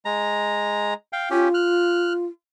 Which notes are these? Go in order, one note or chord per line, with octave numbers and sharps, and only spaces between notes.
G#3 A#5
F5 G5
C#4 F4 G4
F6 F#6